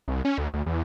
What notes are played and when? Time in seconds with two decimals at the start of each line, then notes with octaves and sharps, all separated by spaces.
0.08 C2
0.25 C#4
0.38 D2
0.54 D2
0.66 E2